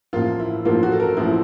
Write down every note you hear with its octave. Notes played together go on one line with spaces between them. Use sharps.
A1 A2 F3 A#3 F4
E4
A1 A2 F3 A#3 F4
F#4
A4
A#4
A1 A2 F3 A#3 E4